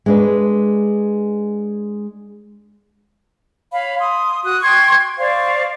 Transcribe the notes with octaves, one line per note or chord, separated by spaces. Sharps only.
G#3 D4 B4
C#5 F5 B5
C6 D#6
F#4 D#6 F#6
G5 C6 C#6 G#6
C5 D5 F5 C#6